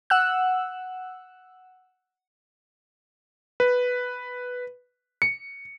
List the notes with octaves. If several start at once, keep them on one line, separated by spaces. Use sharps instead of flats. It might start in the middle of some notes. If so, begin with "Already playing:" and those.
F#5 E6 F#6
B4
C#7